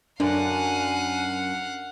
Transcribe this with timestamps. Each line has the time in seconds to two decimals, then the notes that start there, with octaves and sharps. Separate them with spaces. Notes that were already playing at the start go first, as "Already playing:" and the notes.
0.20 F#2 D4 F5 F#5 G#5